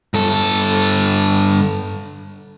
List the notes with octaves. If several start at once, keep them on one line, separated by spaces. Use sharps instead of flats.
G2 A4